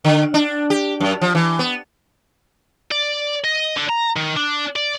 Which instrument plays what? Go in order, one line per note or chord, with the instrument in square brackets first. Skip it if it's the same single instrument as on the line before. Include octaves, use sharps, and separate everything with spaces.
[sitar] D3
D4
G4
F#2
F3
E3
B3
[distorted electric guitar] D5
D#5
D3
A#5
D#3
D4
D5